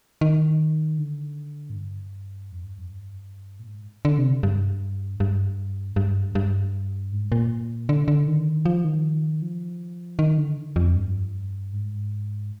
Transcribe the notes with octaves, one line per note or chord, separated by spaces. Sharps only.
D#3
D3
G#2
G2
F2
G2
F2
G2
A#2
G#2
D3
C3
G2
G2
G2
G2
G#2
A#2
D3
D3
D#3
F3
D#3
F3
D#3
D3
F2
G2
G#2